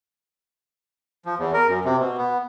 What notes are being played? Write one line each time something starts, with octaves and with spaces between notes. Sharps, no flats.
F3
E2
A#4
F#2
C3
B2
B3